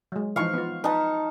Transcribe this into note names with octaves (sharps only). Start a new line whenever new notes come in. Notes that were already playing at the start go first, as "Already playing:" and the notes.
F#3 G#3
E3 F3 D#4 F5 C#6
B3 F4
D#4 B4 A5